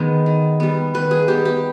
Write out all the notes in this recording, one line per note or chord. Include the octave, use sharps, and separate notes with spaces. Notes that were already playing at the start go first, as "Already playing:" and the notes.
Already playing: D#3 G#3 B3
D#3
G3 B3
D#3 B4
G#4
G3 B3 G4
G4